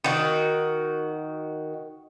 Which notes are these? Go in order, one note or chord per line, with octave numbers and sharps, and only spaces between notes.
D#3 F#4